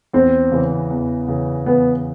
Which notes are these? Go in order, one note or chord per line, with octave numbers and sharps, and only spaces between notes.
E2 C4
C#3 E3
E2
C#3 E3
E2 B3